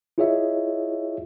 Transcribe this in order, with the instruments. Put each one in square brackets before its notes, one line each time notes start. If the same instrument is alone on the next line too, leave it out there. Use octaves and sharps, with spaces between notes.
[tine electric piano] E4 F4 G#4 C#5 D#5 E5